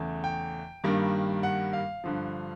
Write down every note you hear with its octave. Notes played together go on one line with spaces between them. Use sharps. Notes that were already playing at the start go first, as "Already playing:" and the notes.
Already playing: E2 C#3 E3 A3
G5
G2 D#3 G3 A#3
F#5
F5
G2 D3 F3